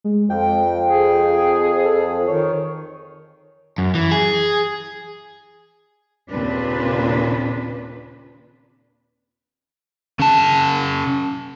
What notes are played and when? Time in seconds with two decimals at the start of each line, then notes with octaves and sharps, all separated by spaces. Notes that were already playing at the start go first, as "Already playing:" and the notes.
0.04 G#3
0.30 F2 G5
0.89 G#4
1.84 A4
2.27 D#3 C#5
3.78 F#2
3.95 E3
4.11 G#4
6.29 D#2 A#2 C#3 C4 D4 B4
10.20 C#3 A5